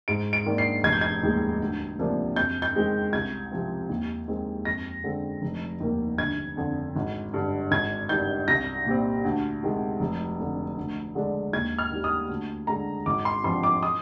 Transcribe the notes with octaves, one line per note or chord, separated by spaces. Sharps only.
G#2 D7
D7
D#3 A#3 D4
C7
F1 G#6
G6
G#6
D#2 D#3 G#3
D2
C3 F3 A#3 D4
F2 G6
G6
D#3 G#3 C4
C2 G#6
C3 F3 C4
D#2
D#3 G#3 C4
F2 A#6
D3 G#3 C4
F1
D#2 D#3 A#3
G1 G#6
F2 D3
G#1
G2 D3
G#1 G#6
G2 D#3 G6
C2 A#6
A#2 G3 C4
D2
C3 D#3 G#3
F1
F2 D3
D2
D3 G#3 D4
D#2 G#6
F6
D#3 G3
D#6
D2
D3 G#3 A#5
G#1 D6
C6
G2 F3 C4 C6
D6
D#6